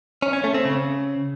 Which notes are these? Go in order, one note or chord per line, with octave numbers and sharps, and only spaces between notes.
C#4
C#4
A3
C4
C#3